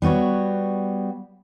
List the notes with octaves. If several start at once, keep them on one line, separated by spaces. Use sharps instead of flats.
G3 B3 F#4 C#5